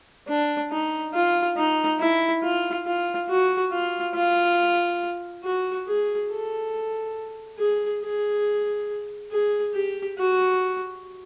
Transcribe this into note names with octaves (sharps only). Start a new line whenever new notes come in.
D4
D#4
F4
D#4
E4
F4
F4
F#4
F4
F4
F#4
G#4
A4
G#4
G#4
G#4
G4
F#4